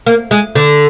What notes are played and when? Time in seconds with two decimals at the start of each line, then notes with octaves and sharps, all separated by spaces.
0.06 A#3
0.31 G#3
0.55 D3